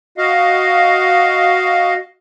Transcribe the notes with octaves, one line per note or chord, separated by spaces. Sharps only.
F#4 D#5 F5